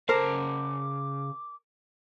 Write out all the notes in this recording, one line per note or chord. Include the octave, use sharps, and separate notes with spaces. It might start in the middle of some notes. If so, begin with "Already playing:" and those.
C#3 A#4 C5 A5 D6